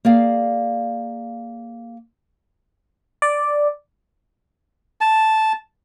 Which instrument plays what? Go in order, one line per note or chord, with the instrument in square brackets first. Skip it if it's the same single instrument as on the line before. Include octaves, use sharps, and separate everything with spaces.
[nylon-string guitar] A#3 G#4 D5 F5
[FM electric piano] D5
[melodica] A5